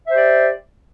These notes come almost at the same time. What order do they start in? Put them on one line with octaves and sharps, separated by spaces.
E5 C5 G4 D5